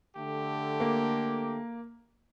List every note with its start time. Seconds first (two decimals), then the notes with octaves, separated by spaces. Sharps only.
0.16 D3 A3 G4
0.80 A#3